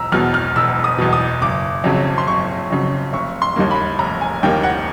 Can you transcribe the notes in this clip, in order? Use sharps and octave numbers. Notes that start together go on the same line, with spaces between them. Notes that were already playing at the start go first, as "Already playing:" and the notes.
Already playing: E1 A#5 E6
E2 B2 F6
F6
E1 E6
D#6
E2 B2
D#6
F#1 D6
F2 C#3 F#3
C6
F#1 C#6
F2 C#3 F#3
F1 C#6
C6
D#2 D#3 G3 A#3
B5
F1 A#5
G#5
D#2 D#3 G3 A#3 G5
F#5